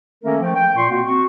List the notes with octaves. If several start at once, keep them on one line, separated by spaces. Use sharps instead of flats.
D#3 A3 A#3 C#4 A4 A#4
F3 A3 G5
G5
A#2 C6 C#6
B2 A#3 C4 F#4
C4 F#4 C#6